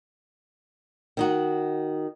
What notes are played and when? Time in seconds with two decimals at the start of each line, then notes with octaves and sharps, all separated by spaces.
1.17 D#3 D#4 F#4